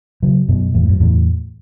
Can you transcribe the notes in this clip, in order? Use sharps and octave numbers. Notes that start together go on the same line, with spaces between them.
C#3 F#3
F#2 B2
E2 A2
F#2
E2 A2